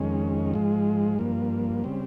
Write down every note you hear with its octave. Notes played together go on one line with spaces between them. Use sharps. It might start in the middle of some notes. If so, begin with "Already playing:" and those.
Already playing: F2 D#3 G#3 C#4
G#2 F3 G#3
G2 F3 A#3
C#3 G3 C4